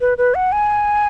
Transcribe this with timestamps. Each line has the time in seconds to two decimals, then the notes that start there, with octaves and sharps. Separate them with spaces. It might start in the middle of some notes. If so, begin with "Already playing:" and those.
0.01 B4
0.18 B4
0.35 F#5
0.52 G#5